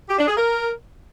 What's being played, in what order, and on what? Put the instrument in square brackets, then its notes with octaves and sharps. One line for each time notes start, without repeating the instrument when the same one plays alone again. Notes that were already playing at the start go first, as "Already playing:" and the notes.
[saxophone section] G4
D4
G#4
A#4